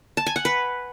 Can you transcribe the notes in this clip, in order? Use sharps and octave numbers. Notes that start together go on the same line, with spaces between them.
A5
G#5
F#5
B4